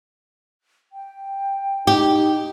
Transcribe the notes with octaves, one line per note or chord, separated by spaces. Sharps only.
G5
D#4 G4